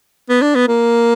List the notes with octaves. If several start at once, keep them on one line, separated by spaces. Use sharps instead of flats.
B3
D4
B3
A#3